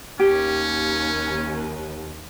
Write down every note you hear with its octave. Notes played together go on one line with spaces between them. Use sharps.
D#2 C#4 G4